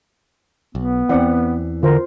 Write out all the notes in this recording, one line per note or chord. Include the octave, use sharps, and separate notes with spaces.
B1 B3
E2 E3 C4 D5 F#5
D3 F4 A#4 C5